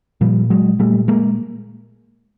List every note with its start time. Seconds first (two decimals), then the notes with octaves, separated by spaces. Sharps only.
0.21 A#2 F3 G3
0.50 F#3 G#3
0.79 A#2 G3 A3
1.08 G#3 A#3